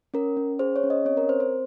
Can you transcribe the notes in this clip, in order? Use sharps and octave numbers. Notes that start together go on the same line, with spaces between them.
C#4 A#4
C#4
G#4 C5
C#5
C#4
D#5
C4 C#5
A#4
C4 C5
C5